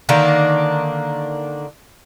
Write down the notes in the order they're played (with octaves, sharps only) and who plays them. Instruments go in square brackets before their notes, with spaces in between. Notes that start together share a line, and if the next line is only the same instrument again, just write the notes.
[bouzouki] D3 D#3 A#3 D4